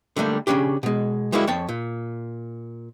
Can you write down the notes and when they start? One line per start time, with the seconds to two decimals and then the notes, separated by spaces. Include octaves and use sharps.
0.16 D3 G3 A3 A#3
0.47 C#3 A#3 C#4 D4 G4
0.83 B2 G#3
1.32 G3 G#3 A#3 B3 E4 F#4
1.47 F2 C#5 G5 A5
1.69 A#2